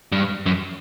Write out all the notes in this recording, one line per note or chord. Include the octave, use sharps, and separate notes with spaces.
G2
F#2